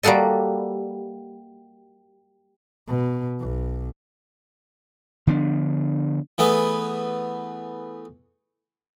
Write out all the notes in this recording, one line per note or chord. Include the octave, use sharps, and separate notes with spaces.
G3 A#3 F#4 A4 D#5
B2
B1
D3 F3 B3 D4
E3 A3 B3 G#4